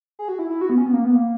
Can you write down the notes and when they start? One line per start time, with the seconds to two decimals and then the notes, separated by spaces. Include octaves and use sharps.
0.19 G#4
0.28 F#4
0.39 E4
0.50 E4
0.61 F#4
0.70 B3
0.78 C#4
0.86 B3
0.93 A#3
1.04 B3
1.15 A#3